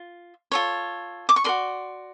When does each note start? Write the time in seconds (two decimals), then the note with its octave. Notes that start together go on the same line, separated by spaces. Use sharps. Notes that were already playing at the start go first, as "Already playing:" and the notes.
Already playing: F4
0.52 F4 A4 C#5
1.29 D6
1.36 C#6
1.44 F#4 A#4 D5 C6